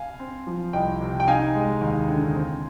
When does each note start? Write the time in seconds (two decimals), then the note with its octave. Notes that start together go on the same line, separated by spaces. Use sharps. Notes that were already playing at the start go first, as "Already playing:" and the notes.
Already playing: F5 G#5
0.19 C4
0.47 F3
0.73 C2 D#5 G5
1.00 C3
1.20 G5
1.27 D#4 F5 G#5
1.55 G#3
1.81 D#2
2.08 D3
2.35 C4